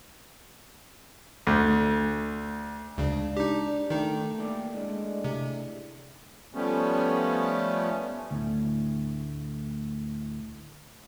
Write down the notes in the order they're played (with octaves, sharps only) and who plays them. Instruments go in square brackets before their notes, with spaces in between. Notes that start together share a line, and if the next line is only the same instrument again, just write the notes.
[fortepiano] D2
[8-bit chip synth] D2 C#3 [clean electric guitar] G#2 [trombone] D4
[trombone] D4 [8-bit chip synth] D#4 G4
[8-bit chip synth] D#3 D#4 [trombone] A3 [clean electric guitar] G4
[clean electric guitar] A#3 G4 D5
[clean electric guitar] A2 D4 [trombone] G#3
[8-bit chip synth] C3
[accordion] F3 G3 A3 B3 C#4
[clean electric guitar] D2 A2